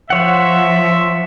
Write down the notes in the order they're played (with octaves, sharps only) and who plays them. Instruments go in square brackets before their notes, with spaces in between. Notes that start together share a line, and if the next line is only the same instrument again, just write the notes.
[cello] F3 [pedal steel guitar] C5 C#5 F#5 [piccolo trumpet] E5